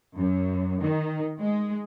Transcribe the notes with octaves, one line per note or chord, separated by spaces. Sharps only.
F#2
D#3
G#3